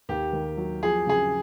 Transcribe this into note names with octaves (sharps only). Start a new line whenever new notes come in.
D#2 G4
D#3
F#3
F3 G#4
C#3 G#4